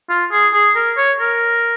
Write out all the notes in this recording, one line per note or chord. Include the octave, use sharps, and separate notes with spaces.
F4
G#4
G#4
A#4
C#5
A#4